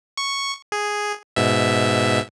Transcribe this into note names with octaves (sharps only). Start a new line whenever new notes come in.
C#6
G#4
G#2 B2 E5